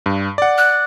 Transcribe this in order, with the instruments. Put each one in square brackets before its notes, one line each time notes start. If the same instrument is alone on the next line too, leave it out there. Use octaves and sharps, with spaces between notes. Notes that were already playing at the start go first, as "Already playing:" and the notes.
[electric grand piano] G2
D5 F#5
[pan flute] F#6